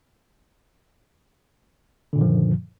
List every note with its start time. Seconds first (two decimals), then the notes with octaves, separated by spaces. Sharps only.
2.13 D3
2.16 A#2
2.18 D#3
2.21 F3
2.24 F#2